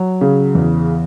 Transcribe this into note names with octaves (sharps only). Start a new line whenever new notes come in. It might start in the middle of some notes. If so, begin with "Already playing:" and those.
Already playing: F#3
C#3
E2